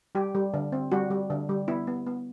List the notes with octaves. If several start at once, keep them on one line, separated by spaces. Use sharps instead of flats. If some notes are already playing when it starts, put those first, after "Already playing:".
G3 G4
G3
D3
C4
G3 F#4
G3
D3
G3
B3 E4
B3
B3